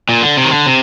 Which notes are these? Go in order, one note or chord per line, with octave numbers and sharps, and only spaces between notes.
A#2
D3
C3
D#3
D3
C3